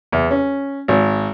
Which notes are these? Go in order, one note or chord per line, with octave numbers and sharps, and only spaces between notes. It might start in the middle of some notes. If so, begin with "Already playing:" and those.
E2
C#4
G#1